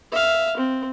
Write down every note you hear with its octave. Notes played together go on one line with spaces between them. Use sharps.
E5 F5
C4